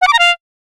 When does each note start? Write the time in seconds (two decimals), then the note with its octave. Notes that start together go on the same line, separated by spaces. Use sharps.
0.02 F#5
0.07 D6
0.13 A#5
0.19 F5